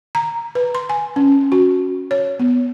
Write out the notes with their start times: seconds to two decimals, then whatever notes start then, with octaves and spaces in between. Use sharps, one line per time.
0.15 A#5
0.55 B4
0.75 C6
0.90 G#5
1.16 C#4
1.52 F#4
2.11 C#5
2.40 B3